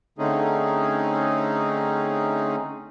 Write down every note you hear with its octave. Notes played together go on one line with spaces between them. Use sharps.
D3 A3 C4 C#4 D#4 G#4